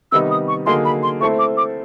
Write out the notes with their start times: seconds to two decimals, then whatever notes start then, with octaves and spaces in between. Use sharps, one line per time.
0.12 C3 D#3 G3 B3 D#4 E6
0.31 D#6
0.48 C#6
0.66 D3 F#3 A#3 D#4 G#4 C6
0.85 B5
1.03 C6
1.20 A3 C4 E4 A4 C5 C#6
1.39 D6
1.57 D6